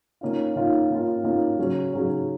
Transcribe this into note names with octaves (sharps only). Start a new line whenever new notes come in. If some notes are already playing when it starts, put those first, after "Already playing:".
D#3 A#3 C#4 F4
D#3 A#3 C#4 F4
D#3 A#3 C#4 F4
D#3 A#3 C#4 F4
C#3 F#3 C#4
C#3 F#3 C#4